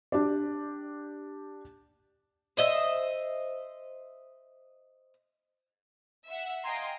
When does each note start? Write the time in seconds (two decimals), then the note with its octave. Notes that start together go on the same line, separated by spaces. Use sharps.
0.12 D4 G4 D5
2.57 C5 D#5 E5
6.26 E5 F#5
6.63 D#5 F5 G5 G#5 A#5 C6